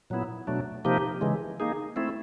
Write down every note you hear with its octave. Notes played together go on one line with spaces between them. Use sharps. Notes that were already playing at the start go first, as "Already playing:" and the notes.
A#2 F#3 B3 E4
B2 F#3 A3 D4
C3 F3 A#3 D#4 G4
C#3 E3 G#3
A#3 D#4 G#4
A3 C4 E4